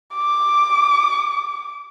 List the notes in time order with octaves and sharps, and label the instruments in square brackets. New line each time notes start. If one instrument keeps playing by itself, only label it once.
[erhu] D6